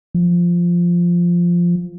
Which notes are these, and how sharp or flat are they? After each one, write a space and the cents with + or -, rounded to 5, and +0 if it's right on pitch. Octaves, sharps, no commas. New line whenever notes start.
F3 -5